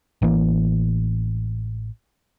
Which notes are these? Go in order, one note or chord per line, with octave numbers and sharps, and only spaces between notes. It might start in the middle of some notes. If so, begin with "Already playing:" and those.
A1 E3 A#3